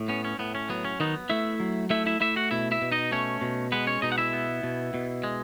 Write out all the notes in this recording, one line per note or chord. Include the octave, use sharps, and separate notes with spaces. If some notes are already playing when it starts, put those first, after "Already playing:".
Already playing: A2
B3 C#4
C#4
A2 B3
C#4
F#3 B3
C#4
D#3 B3 D#4
A3 E4 E5
F#3
A3 E4 E5
E4 E5
A3 E4 E5
F#4 F#5
B2 E4 E5
E4 E5
B2
D#4 D#5
A3 C#4 C#5
B2
G#3 B3 B4
C#4 C#5
B2 D#4 D#5
F#5
E4 E5
B3
B2
B2
G#3